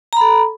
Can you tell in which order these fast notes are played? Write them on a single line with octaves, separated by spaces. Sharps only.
A#5 B5 A4